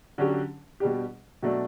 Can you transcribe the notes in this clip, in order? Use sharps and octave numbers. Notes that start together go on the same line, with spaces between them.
D3 F#3 C#4 G4
B2 G3 D4 G4
B2 F#3 A3 D4